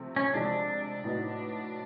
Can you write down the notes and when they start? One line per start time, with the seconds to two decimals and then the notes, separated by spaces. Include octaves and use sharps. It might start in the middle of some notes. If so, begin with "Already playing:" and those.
Already playing: C3 F3 A3 C4
0.16 C#4
0.34 C3 F3 G#3 D4
1.04 A2 F#3 B3 D#4